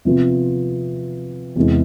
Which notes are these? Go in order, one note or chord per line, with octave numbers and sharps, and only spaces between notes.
C3 F3 B3 F4
E2 C3 G#3 B3 E4